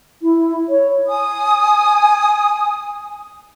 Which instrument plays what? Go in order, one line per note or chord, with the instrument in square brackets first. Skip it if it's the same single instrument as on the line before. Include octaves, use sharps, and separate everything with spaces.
[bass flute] E4
C#5
[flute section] G#5 D#6